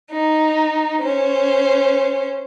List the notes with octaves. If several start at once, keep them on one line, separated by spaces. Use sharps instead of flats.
D#4
C#4 C5